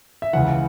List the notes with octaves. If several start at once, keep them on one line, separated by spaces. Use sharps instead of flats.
E5
C#2 C#3 E3 F#5